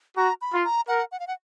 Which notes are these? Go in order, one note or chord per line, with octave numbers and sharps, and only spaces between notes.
F#4 A#5
B5
F4
A#5
A#4 F#5
F#5
F5
F#5